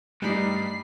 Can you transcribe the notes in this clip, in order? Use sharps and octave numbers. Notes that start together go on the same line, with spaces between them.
G2 G3 A3 D#4 B5 C7